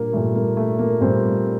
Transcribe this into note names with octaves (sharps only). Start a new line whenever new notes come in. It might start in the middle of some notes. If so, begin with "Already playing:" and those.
Already playing: A#2 G3 A#3 D4
A#2 G3 A3
A#3
A3
A#3
A#2 G3 C4